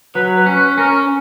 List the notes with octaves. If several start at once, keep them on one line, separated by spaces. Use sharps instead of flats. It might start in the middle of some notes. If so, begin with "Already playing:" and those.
F#3 B4
B4
C#4
B4
C#4 A#4